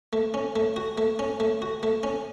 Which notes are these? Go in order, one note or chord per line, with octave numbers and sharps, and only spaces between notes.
A3
C#4
A3
F#4
A3
C#4
A3
F#4
A3
C#4